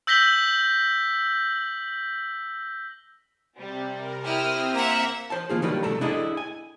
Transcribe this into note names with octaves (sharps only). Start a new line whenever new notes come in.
E6 G6 A#6 B6 F#7 G7
C3 G3
A#4
C4 E4 G4 D#6 F6
A#3 E5 F#5 A#5
C5 A5
D#3 A#3 F4 G#4
D#3 F#3 G3 A#3 D4 B4
C2 G2 A3 A4 A#5
D4 E4 G#4 A4 D#5
G#5